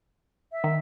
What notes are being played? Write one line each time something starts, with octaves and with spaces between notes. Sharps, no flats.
E5
D#3